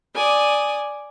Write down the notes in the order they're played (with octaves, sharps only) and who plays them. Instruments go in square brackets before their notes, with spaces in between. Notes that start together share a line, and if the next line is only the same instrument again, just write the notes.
[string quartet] D5 G#5 D#6